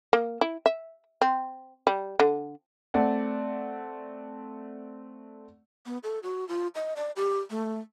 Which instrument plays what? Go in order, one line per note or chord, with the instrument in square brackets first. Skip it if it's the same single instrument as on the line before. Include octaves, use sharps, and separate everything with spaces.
[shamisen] A#3
E4
E5
C4
G3
D3
[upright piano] A3 C4 D5 F#5
[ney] B3
A4
F#4
F4
D#5
D5
G4
A3